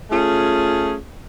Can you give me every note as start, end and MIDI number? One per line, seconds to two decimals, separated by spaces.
0.11 0.96 57
0.11 0.96 61
0.11 0.96 65
0.11 0.96 68